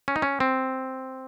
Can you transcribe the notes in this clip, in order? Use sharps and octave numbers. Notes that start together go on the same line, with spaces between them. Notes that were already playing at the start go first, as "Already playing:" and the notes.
C#4
D#4
C#4
C4